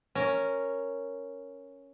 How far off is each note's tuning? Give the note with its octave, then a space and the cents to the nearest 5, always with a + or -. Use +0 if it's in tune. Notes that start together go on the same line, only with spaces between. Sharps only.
C#4 +0 A#4 +0